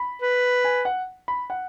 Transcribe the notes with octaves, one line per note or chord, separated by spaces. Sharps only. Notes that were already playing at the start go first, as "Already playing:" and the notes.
Already playing: B5
B4
G#5
F#5
B5
F#5